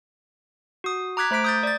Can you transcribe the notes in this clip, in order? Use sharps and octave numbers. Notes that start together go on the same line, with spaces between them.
F#4 D#6
A#5 D6 F#6 G#6 B6
A3 C5 A#5 B6 D7
D#6 G6 A6
D5 A6